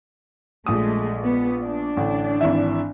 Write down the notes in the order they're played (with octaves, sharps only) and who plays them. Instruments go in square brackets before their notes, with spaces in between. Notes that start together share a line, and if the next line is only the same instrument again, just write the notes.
[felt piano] A#1 D#6 [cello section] G#3 A3
[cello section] B3
D4
[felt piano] A1 D3
G#1 E3 E5